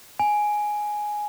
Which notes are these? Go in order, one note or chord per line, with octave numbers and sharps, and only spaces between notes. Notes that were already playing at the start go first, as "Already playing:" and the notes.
G#5